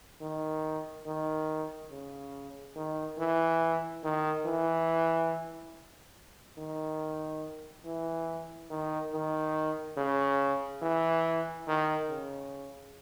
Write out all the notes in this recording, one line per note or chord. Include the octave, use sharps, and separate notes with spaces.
D#3
D#3
C#3
D#3
E3
D#3
E3
D#3
E3
D#3
D#3
C#3
E3
D#3
C#3